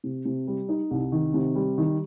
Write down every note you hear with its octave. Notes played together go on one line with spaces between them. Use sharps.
C3
C3
G3
D#4
C2
D#3
C3
G3
D#3